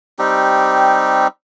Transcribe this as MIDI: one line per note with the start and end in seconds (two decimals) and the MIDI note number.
0.19 1.27 55
0.19 1.27 60
0.19 1.27 63
0.19 1.27 67